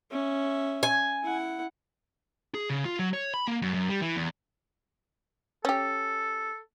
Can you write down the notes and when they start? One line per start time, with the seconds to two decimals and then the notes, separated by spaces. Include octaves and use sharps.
0.11 C#4 E5
0.83 G#5
1.23 E4 F#5
2.55 G#4
2.69 C#3
2.85 F4
2.99 F#3
3.14 C#5
3.34 B5
3.48 A#3
3.62 F#2
3.74 F#2
3.90 G3
4.02 E3
4.16 E2
5.65 C#4 G4 A4